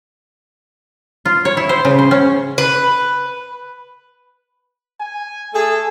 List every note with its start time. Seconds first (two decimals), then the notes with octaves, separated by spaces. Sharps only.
1.25 F4
1.45 C#5
1.57 E4
1.69 C5
1.85 C#3
1.99 C5
2.11 C#4
2.58 B4
5.01 G#5
5.54 A3 G#4 A4